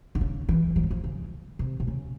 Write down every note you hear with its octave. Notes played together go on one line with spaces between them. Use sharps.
D3
C#3
E3
F3
F#3
F3
C#3
C3
C3
C#3